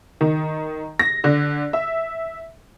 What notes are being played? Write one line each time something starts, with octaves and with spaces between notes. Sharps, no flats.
D#3
A#6
D3
E5